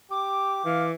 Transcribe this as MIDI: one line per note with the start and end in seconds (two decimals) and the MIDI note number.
0.11 0.62 67
0.11 0.90 86
0.65 0.93 52
0.65 0.83 77